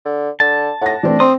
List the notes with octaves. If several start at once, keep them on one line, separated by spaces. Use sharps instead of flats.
D3
D3 A5
A2 F#5 A#6
E3 A3 C4 D4
C4 C6 D#6